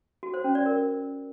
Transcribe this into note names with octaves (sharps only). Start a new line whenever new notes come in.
F#4
C5
C#4
D5
A#4